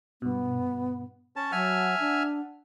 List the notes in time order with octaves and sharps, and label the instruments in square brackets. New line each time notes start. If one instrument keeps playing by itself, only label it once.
[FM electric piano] G2 B2 [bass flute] B3
[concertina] C#4 A5
[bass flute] F#3 [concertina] E5 G#5 F6 [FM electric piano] F#5 A5
[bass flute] D4